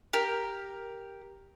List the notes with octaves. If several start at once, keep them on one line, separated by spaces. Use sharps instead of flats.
G4 A#4